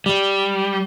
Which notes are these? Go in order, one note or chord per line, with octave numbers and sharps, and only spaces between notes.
G3